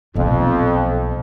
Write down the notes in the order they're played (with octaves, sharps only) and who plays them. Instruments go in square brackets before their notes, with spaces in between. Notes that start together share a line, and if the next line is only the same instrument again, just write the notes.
[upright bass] B1 A#2 [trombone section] F2